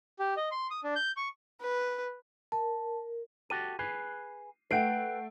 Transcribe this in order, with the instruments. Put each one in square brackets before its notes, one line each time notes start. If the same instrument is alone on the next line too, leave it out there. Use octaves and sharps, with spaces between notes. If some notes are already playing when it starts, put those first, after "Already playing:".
[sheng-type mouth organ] G4
D#5
C6
D#6
D4
G6
C#6
[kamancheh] B4
[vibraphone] A#4 [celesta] A5
[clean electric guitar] F#4 G4 A4 [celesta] D#7
[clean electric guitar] G#4 B4 [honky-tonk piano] C7
[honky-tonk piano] A3 D7 [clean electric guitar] B4 G5 [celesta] F#5 G6 C7